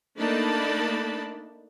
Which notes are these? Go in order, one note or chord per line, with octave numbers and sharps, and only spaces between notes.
A3 A#3 D4 D#4 A5 B5